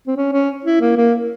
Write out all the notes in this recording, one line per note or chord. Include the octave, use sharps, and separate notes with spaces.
C4
C#4
C#4
E4
A#3
A#3